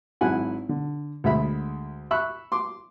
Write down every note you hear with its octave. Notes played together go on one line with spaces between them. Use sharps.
G#1 F#3 E4 F#5 G#5 F#6
D3
D2 G#3 E5 B5
E5 B5 C#6 E6 F#6
C6 D6